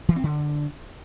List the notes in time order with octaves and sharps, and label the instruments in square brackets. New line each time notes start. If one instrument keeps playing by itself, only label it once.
[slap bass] E3
C4
D3